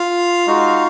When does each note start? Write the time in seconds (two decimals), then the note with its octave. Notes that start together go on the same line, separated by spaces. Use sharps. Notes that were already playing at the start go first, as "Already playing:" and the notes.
Already playing: F4 F5
0.47 G#3 D#4 F#4